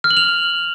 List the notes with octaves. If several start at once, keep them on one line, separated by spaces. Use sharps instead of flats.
F6
F#7
F7